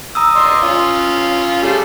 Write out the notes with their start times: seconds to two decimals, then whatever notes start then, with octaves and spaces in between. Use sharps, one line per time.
0.15 A#5 D#6 E6
0.36 D5 D#5 C6
0.62 C#4 F4
1.62 G3 A3 G#4